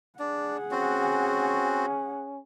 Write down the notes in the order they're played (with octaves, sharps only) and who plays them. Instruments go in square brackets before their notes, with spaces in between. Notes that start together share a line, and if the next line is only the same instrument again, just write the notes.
[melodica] D4 [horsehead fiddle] G#4 F#5
[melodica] C4 F#4 [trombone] C#4